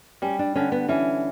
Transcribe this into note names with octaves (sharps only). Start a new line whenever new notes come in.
G3 C#4
D4
D3 C#4
B3
E3 C#4